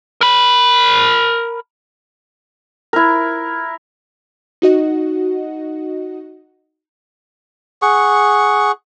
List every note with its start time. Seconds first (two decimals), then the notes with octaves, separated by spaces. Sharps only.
0.21 A#4 B5
2.93 E4 A#4
4.62 D#4 F#4 D#5 F#5
7.82 G#4 F#5 C#6